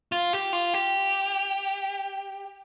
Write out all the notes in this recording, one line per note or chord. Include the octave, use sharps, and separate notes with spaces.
F4
G4
F4
G4